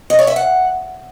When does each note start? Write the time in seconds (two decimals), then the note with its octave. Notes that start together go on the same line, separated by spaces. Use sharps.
0.10 D#5
0.19 C#5
0.27 E5
0.36 F#5